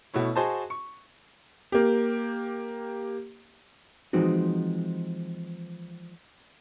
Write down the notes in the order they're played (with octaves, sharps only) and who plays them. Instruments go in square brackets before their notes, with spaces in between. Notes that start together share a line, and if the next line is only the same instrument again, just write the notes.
[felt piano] B2 A3 E4 C#5
F#4 G#4 C5 D#5 A5
C#6
[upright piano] A#3 G4
[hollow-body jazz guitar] E3 F3 G#3 C4 D#4 F#4